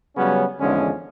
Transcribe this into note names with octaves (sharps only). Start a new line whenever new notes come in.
C#3 F#3 G3 B3 C#4
G#1 E2 D3 F3 G#3 C#4